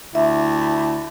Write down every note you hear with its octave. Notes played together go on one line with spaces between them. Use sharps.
D2 E4 E5